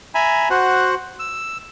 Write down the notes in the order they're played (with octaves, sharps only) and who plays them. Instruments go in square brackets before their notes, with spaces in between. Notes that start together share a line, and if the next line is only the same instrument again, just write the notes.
[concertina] E5 G#5 A#5 B5
F#4 C5 F#5
E6